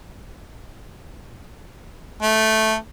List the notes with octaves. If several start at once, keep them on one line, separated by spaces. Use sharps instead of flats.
A3